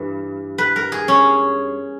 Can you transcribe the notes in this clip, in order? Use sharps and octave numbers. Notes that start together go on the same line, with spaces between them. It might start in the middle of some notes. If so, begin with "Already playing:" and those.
Already playing: G2 E3
B4
A#4
G#4
C#4